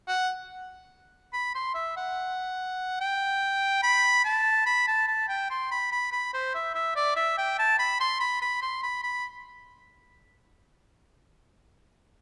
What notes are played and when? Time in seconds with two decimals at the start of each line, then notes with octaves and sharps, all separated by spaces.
0.08 F#5
1.33 B5
1.55 C6
1.75 E5
1.97 F#5
3.00 G5
3.83 B5
4.25 A5
4.66 B5
4.88 A5
5.08 A5
5.29 G5
5.50 C6
5.71 B5
5.92 B5
6.12 B5
6.34 C5
6.55 E5
6.75 E5
6.96 D5
7.16 E5
7.38 G5
7.59 A5
7.79 B5
8.00 C6
8.20 B5
8.42 B5
8.62 C6
8.83 B5
9.03 B5